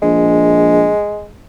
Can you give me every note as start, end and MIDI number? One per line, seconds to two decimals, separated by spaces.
0.03 0.91 34
0.03 1.28 56